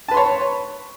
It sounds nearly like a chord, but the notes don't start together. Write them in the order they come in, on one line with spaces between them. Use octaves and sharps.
A5 B4 C6 C#5